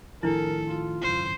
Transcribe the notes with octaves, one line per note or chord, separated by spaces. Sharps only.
A2 D#3 F3 D4 E4 A4 A#4
F4
G#1 C#2 F#2 C5